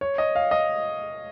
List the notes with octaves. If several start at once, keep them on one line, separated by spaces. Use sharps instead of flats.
C#5
D#5
F5
D#5